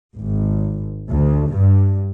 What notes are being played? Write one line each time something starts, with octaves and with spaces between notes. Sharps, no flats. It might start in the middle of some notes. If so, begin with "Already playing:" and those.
G#1
D2
G2